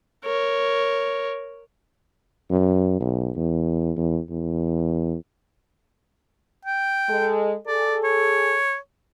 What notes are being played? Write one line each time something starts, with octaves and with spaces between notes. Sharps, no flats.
A#4 C#5
F#2
B1
E2
E2
E2
G5
G#3 A4
G#4 A4 D5
C#5